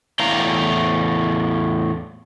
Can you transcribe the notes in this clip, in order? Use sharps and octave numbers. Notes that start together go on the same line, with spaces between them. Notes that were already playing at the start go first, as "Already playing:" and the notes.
E2 A2 F5 G5 A#5